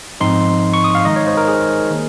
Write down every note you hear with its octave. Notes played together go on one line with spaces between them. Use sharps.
G#2 F3 C4 D#4 C6
C#6
D#6
F5
D#3 G#3 D#4 D#5
C#5
C5
A#4
G#4
D#3 A#3